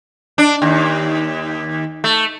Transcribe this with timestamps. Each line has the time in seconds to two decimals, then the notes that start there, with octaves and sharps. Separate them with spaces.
0.38 D4
0.62 D#2
2.04 A3